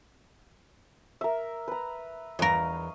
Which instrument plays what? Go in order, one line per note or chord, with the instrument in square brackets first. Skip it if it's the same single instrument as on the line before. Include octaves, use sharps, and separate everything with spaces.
[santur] A#4 E5
B4 A#5
[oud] E2 A#4 [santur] D#5 F5 C#6